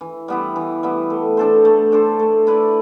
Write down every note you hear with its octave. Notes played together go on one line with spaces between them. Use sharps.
E3
G3 B3 E4
E3
G3 B3 E4
A3
D4 A4 C5
A3
D4 A4 C5
A3
E4 B4 D5